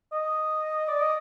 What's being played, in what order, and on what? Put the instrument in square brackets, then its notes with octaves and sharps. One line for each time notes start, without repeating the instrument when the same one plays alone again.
[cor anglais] D#5
D5
D#5